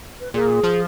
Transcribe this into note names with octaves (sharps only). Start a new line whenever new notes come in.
B4
A#2 G#4
F3